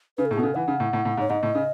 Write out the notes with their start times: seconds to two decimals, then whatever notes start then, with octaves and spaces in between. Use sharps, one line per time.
0.18 C#3 B4
0.25 A4
0.31 A2 G#4
0.37 B2
0.40 C#3 A4
0.55 E3 F#5
0.68 C#3
0.80 A2
0.93 A2
1.05 A2
1.17 G#2
1.20 C#5
1.30 G#2 D#5
1.43 A2
1.55 C#3